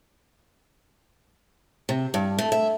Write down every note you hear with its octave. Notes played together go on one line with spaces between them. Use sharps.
C3
G2
A3
E5